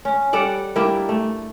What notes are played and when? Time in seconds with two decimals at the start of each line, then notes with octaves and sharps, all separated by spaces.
0.05 C#4
0.33 G3 A4 D5 F#5
0.76 G3 A#3 D4 E4
1.09 A3